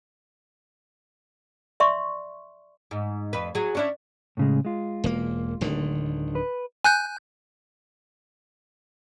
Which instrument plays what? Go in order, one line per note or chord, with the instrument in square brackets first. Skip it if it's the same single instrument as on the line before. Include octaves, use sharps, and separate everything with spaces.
[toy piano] D5 E5 C6 C#6
[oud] G#2
F2 B4
F#3 G#4
C#4 D4 E4
[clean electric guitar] A2 C#3 G#3
G#3 F4
[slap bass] E1 A#3
D1 D3 D#3
[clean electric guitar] B4
[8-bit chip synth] G#5 F#6 G6